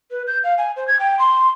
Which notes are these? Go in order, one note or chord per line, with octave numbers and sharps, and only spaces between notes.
B4
G6
F5
G#5
C5
G#6
G5
C6